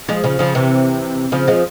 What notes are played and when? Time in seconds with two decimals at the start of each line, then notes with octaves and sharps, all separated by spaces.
0.09 F3 G#3
0.24 C#3 F3
0.39 C#3 F3
0.55 C3 E3
1.32 C#3 F3
1.47 F3 G#3